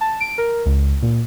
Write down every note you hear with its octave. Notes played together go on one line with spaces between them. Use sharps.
A5
D7
A#4
C#2
A#2